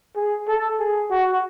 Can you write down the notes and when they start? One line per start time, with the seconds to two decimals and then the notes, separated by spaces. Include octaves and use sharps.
0.16 G#4
0.48 A4
0.79 G#4
1.11 F#4